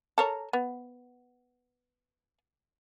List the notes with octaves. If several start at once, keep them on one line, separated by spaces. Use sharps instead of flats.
A4 A#4 C#5
B3